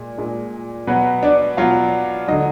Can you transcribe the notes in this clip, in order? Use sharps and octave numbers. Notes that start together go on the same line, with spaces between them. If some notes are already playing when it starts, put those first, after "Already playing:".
Already playing: A#2 G#3
A#2 G#3
B2 F#3 B3 B4
D4 D5
B2 F#3 F4 F5
D3 F#3 D#4 D#5